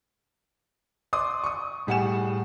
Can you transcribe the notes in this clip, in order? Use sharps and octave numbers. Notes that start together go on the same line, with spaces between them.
D5 C6 D6 D#6
C#6 D#6
A2 G3 G#4 F#5 G#5 E7